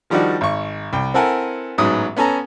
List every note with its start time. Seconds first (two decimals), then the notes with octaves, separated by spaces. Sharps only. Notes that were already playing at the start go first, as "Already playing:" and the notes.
0.10 D#3 F3 G3 D4 D#4 F#4
0.41 G#1 C#6
0.93 C2 G5
1.14 C4 E4 A4 A#4 F#5 G#5
1.78 A1 G#2 F#3 B3 D#6
2.16 B3 C#4 A4 G#5 A#5